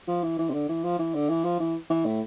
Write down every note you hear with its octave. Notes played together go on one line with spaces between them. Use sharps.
F3
E3
E3
C3
D3
E3
F3
E3
D3
E3
F3
E3
E3
A2